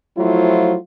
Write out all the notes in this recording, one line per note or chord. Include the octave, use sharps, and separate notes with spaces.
F3 F#3 A3 E4 F4 C5